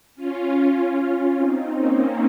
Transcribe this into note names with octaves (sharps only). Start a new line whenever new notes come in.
C#4 F4
C4 D#4
A#3 C#4